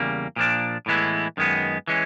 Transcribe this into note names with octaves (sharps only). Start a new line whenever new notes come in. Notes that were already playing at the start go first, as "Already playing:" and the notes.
Already playing: E2 C#3 G3 A#3
A#2 F3 A#3 D4
A2 E3 G#3 B3 E4
F#2 D#3 G#3 B3
E3 G#3 C#4